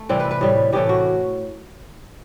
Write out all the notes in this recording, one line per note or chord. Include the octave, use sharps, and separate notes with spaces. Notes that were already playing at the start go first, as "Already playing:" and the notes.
Already playing: A3
C3 E3 G3 C4
B4
B4
A2 G3
A2 E3 A3 G4
F#4